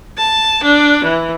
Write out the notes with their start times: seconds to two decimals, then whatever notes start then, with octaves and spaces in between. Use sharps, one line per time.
0.17 A5
0.62 D4
1.04 E3